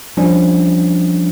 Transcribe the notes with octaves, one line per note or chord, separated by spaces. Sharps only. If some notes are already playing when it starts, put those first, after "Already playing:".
F3 G3 C#4 D4